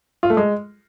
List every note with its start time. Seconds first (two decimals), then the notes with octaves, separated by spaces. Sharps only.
0.23 F4
0.30 A3
0.37 G#3